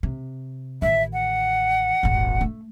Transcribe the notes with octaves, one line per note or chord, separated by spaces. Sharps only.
C3
A1 D#3 E5
F#5
D#1 G#1
A3